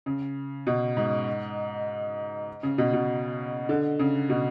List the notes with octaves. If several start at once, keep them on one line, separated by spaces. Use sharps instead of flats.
C#3
B2
G#2
C#3
B2
B2
D3
C#3
B2